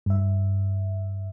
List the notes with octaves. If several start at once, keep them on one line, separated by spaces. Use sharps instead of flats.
G2 E5